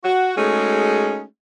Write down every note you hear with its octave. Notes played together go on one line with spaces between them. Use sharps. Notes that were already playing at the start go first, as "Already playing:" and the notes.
F#4
G#3 A3 C#4 D#4 F#4 G#4